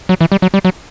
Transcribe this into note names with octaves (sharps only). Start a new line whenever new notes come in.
F#3
E3
G3
F#3
G3
F#3